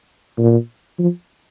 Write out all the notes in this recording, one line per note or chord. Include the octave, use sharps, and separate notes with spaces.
A#2
F3